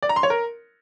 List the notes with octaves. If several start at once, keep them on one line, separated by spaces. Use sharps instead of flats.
D5
A#5
C6
C#5
A#4